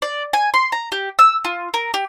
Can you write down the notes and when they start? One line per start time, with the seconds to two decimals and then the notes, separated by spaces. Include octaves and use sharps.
0.02 D5
0.33 G#5
0.54 C6
0.72 A#5
0.92 G4
1.19 E6
1.44 F4
1.74 A#4
1.94 G4